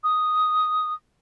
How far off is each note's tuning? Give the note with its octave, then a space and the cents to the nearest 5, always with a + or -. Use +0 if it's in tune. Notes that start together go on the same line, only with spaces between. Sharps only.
D#6 +0